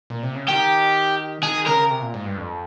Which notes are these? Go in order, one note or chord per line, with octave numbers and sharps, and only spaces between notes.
A#2
C3
C#3
D#3 G4
D#3 G#4
C#3 A#4
C3
A#2
G#2
G2
F2